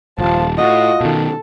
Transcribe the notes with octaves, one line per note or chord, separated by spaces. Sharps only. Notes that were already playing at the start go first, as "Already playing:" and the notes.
D#1 G#1 F3 A5
A2 F4 F#4 D#5
B2 D#3 A4